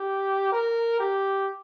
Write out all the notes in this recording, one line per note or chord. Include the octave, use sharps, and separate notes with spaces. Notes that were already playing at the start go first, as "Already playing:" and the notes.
Already playing: G4
A#4
G4